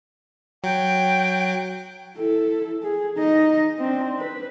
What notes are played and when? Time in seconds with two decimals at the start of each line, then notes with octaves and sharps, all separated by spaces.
0.64 F#3 G5
2.17 E4 A4
2.82 G#4
3.18 D#4 D#5
3.79 C4 D4
4.20 B4